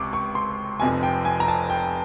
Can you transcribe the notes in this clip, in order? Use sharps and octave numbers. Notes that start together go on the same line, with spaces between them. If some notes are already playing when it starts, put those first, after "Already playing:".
Already playing: C#2 C3 C#6 D6
C#6
C6
F1 F2 C3 F3 G#5
G5
G#5
A#5
A5
G5